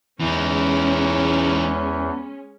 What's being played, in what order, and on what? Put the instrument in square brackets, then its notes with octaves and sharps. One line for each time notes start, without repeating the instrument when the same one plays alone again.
[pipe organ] E2 [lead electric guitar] E3 D#4 [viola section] G#3 C#4